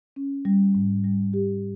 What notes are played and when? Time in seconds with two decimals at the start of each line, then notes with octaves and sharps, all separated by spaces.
0.16 C#4
0.45 G3
0.75 G#2
1.04 G3
1.33 G4